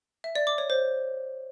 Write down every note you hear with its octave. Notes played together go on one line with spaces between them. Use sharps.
E5
D5
D6
C#5
C5